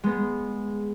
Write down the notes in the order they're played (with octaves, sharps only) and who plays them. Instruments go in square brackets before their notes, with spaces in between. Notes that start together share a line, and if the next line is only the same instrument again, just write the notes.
[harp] G#3 B3